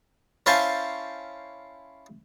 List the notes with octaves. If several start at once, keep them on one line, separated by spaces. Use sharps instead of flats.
C#4 E4 C5 F5 G#5 A5